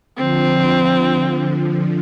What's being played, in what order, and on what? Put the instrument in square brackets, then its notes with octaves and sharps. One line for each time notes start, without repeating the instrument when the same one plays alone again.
[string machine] D3 F3 [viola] C4